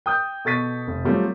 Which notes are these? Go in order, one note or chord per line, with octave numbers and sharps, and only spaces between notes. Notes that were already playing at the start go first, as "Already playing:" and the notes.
G5 D#6 G6
B2 A4 C#6 A6 B6 D#7
F1
F#3 G3 A3 C4 F4